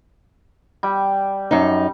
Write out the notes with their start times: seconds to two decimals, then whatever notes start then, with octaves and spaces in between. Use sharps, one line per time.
0.83 G3
1.51 F#2 D#4